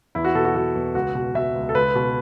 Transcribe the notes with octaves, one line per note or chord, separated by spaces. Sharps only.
E2 E4
F#4
B2 A4
F#4
B2 F#4
E2
C#2 F#4
B2
B2 E5
C#2
A4
C#2 B4
B2